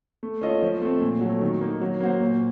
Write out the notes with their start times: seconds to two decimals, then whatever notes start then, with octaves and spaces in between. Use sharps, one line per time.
0.23 A3
0.41 C#4 F4 A4 D#5
0.62 F3
0.82 A3 C4
1.01 A#2
1.21 F#3 A3
1.41 D#3
1.61 A#3 D#4
1.81 F#3
2.00 A#3 C#4 F#4 C5
2.20 A#2